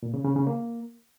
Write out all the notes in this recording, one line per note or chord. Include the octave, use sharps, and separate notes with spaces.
A#2
C#3
C#3
C#3
A#3